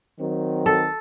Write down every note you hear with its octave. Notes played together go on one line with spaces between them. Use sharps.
D#3 F#3 C4
A4